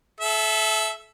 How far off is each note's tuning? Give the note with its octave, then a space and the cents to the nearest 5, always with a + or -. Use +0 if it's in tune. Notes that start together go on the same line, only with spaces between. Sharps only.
A4 -30 E5 +0